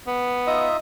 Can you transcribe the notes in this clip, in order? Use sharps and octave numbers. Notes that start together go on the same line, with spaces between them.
B3
D#4 F4 D#5 E5